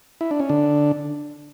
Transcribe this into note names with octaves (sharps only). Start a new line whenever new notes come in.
E4
D4
C#4
D3 D4